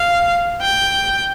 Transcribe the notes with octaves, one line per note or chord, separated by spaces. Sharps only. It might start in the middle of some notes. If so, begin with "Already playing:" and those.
Already playing: F5
G5